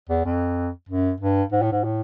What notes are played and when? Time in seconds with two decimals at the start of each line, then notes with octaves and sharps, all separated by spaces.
0.10 E2
0.25 F2
0.89 F#2
1.21 G2
1.52 G#2
1.62 A2
1.72 G#2
1.84 A2